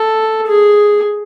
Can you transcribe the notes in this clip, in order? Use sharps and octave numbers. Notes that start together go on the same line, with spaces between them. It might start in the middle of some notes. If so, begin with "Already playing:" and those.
Already playing: A4
G#4